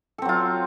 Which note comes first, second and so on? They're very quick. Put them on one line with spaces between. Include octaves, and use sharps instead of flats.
A4 C4 F#3 F4